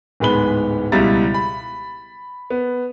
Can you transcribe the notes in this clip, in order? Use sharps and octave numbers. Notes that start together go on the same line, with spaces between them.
D1 G#2 G#3 B3 B5 G7
C#2 B2 G3 E4 A#5 A6
B5
B3